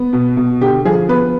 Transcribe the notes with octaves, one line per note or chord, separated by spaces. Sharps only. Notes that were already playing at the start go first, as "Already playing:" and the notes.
Already playing: B3
B2
B2
D3 G4
F3 G#4
B3 B4